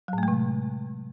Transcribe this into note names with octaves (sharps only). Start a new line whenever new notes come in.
A2 C3 F#3 G#3 A3